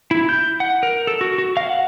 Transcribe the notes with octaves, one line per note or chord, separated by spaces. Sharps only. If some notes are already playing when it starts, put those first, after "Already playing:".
E4
G6
F#5
A#4
A4
F#4
F#4
F5
F#5